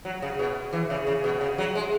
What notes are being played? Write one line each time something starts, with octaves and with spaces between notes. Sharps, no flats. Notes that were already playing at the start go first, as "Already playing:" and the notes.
F#3
C#3
B2
E3
C#3
C#3
B2
C#3
F#3
G#3